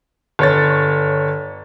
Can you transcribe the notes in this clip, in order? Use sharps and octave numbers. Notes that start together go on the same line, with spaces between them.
G1 C#5 A6